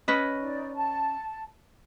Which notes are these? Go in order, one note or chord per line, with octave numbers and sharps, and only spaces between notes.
C#4 B4 D#5
D#4 D5
A5